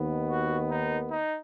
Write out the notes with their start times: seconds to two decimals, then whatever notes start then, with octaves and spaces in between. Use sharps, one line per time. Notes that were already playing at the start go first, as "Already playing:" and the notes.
Already playing: D#2 D#3 B3
0.30 F#4
0.70 D#4
1.11 D#4